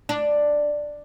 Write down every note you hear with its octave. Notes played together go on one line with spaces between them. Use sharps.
D4